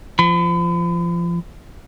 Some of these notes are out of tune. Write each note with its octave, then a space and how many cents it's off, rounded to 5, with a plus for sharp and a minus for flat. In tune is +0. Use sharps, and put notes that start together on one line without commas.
F3 -25 B5 +40